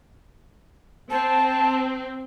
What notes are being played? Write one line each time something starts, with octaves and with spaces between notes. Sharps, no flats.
C4 A5